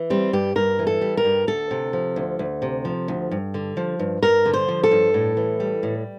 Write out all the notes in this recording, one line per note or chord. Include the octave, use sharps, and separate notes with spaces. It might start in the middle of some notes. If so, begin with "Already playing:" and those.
Already playing: E3
G3 C4
G2 G4
G2 A#4
E3
A4
G3
A#4
G2
D2 A4
C3
F3
D2
D2
C3
F3
D2
G2
D3
F3
G2
G2 A#4
D3
C5
F3
A4
G2
A2
E3
G3
A2